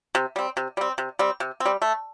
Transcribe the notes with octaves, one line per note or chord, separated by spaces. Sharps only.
C3
G3 C4
C3
G3 C4
C3
G3 C4
C3
C4
G3
A3